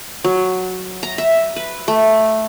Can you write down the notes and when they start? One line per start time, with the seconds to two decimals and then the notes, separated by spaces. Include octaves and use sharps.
0.24 F#3
1.03 A#5
1.18 E5
1.56 B4
1.88 A3